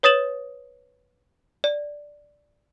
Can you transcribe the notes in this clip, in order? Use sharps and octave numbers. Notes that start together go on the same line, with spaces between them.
B4 C#5 D#6 A6 E7 F#7
D5